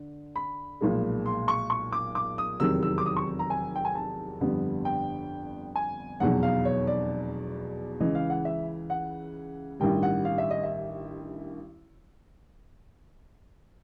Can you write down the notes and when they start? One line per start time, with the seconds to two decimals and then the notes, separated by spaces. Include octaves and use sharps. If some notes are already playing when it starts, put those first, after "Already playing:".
Already playing: D3
0.36 B5
0.81 B1 A#2 F3 G#3
1.26 C6
1.48 C#6
1.70 C#6
1.93 D6
2.15 D6
2.38 D#6
2.60 F1 E2 C3 D#3 F#3 E6
2.83 E6
2.98 D6
3.06 D#6
3.16 C#6
3.39 A#5
3.50 G#5
3.76 G5
3.85 G#5
3.95 A5
4.40 G1 F2 D3 G3 B3
4.85 G5
5.75 G#5
6.20 F1 E2 B2 F#3 F#5
6.43 F5
6.65 C#5
6.87 D5
8.00 C#2 C#3 E3 D#5
8.15 F5
8.30 F#5
8.45 E5
8.90 F#5
9.80 A1 G2 D#3 G3 G5
10.03 F#5
10.25 F5
10.38 E5
10.50 D#5
10.63 E5